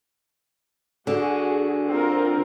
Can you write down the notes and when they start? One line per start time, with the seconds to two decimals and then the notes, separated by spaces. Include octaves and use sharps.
1.07 D3 F#4 G#4
1.88 C4 F4 A#4